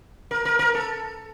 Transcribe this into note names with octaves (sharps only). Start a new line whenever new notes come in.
A#4
A#4
A#4
A4